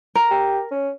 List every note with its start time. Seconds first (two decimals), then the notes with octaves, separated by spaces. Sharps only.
0.15 A#4
0.30 G4
0.71 C#4